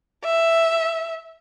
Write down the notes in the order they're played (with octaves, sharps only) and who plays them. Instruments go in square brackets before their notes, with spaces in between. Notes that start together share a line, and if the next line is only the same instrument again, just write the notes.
[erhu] E5